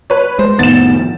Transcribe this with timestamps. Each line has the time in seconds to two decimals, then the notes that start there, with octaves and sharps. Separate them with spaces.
0.10 B4 C#5
0.39 G#3 C5
0.59 F2 A2 D#3 B3 A6 E7